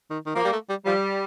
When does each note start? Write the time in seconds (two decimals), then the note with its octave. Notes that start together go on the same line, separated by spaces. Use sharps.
0.10 D#3
0.27 D#3
0.35 F3 A#3
0.45 G3
0.53 A3
0.70 G3
0.86 F3 G3